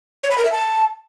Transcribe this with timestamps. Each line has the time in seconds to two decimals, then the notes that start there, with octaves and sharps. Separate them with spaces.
0.23 C#5
0.31 B5
0.38 A#4
0.45 E5
0.52 A5